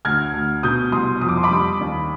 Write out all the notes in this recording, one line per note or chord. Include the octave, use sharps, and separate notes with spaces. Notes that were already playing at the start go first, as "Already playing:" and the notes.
D2 F6 G#6
D2
B2 D#6 G6
C2 C6 D#6
F2 D#6
D6
C6
B5 D6
G3
D#2